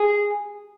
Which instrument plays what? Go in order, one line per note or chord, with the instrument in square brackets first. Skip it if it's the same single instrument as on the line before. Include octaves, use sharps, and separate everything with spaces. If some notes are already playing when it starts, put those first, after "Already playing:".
Already playing: [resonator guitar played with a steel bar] G#4